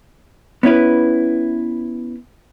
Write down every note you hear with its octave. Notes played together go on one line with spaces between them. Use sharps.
B3 C#4 E4 B4